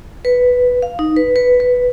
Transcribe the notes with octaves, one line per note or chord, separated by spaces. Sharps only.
B4
F5
D#4
B4
B4
B4